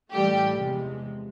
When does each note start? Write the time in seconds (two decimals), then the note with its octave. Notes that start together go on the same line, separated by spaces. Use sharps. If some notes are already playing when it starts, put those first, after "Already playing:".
0.11 A2 E3 G3 A3 G4
0.59 E2 C3 F3 G#3